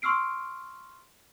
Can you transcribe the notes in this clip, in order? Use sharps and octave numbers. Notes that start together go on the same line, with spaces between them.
C6 C#6 E6 F6 C7 D7